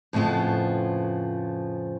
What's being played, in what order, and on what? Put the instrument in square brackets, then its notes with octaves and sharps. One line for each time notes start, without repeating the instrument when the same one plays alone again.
[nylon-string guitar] F2 A2 C#3 F3 B3